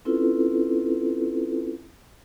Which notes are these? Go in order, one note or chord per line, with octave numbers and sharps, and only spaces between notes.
C4 C#4 E4 F4 A4 B4